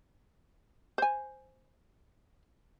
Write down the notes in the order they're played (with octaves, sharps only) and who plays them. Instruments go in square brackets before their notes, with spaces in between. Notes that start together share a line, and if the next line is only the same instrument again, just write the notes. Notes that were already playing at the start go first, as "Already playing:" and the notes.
[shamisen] C5 G#5